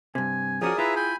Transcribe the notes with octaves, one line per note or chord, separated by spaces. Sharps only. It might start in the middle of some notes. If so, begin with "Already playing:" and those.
G2 C3 G#5
F3 C#4 F#4 G#4 A#4 D5 D#6
E4 F4 B4 E5 A#5
G5 G#5 B5